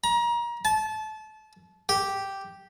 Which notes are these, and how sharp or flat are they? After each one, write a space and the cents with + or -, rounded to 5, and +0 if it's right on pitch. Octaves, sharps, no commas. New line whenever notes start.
A#5 +30
A5 -25
G4 -5